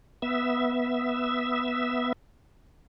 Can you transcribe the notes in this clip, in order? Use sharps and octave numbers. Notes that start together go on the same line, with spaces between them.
B3 E5